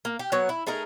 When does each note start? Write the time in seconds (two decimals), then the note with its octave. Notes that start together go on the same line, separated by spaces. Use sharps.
0.05 A#3
0.19 G4
0.32 F#3 B3 C#5
0.49 E4
0.67 A3 D#4 G#4 A#4